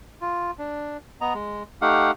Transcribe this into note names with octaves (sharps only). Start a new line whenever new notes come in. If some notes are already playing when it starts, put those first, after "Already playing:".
F4
D4
B3 D#5 A#5
G#3
A3 D#4 G4 F5 F#5